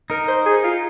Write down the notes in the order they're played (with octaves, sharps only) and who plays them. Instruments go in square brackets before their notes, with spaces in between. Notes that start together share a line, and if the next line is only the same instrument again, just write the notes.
[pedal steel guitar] D#4 [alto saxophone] A#4
[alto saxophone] C5
G#4
F4